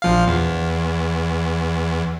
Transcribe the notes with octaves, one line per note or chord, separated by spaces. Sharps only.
A#1 F3 F5
E2